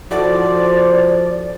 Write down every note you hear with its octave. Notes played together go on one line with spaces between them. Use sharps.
F3 E4 F#4 A4 C5 D5